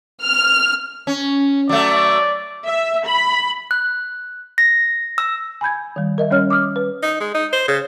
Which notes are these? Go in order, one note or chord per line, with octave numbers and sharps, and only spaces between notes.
F6
C#4
F#3 A3 D5
E5
B5
F#6
A#6
E6
G#5 B5 G6 G#6
D#3 G3
A#4 D#5 E5
G3 C#4 C#5 F6
D6 D#6 F6
B4
D#4
G#3
D#4
C5
C#3